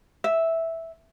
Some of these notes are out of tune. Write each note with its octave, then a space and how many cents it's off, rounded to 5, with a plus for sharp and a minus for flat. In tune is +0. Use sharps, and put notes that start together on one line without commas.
E5 -5